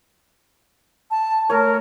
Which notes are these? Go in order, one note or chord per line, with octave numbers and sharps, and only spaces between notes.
A5
A3 A#4 C#5